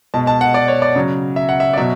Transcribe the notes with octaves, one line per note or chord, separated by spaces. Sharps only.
B2 G#3 A5
A5
F#5
D5
C#5
D5
C#3 F#3
E5
F#5
E5
D5
B2 F#3 E5